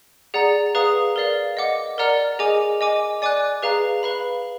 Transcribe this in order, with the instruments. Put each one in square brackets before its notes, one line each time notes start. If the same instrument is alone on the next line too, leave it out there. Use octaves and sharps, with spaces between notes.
[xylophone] G#4 D5 F#5 A#5
G#4 B4 F5 A#5 D#6
A#4 D5 F5
D#5 F#5 D6
A#4 D5 F#5 A#5 F6
G#4 D#5 G#5 D6
D#5 G#5 D6
D5 G#5 D6 F#6
G#4 B4 F5 A#5
B4 F5 B5